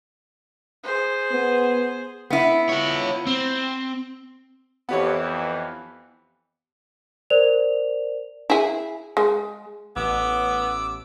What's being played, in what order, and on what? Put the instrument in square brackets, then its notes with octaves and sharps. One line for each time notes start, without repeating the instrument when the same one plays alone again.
[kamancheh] G#4 C5
[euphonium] B3
[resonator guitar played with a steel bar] B3 E4
[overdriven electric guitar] F4 C#5
C4
[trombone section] F2 E3 [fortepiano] B3 G4 C#5
[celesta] A#4 C5 D5 F7
[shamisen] E4 G#4
G#3
[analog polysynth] A1 [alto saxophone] B3 [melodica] D6 E6